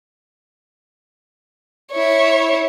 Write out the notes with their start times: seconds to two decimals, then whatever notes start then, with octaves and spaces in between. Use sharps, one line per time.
1.92 E4 C#5